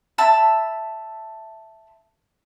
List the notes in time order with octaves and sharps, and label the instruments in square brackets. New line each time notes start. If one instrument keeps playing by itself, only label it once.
[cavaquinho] E5 A5 B5